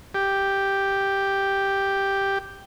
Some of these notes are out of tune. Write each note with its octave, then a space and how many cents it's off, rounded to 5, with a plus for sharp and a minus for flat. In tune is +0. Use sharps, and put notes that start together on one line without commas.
G4 +0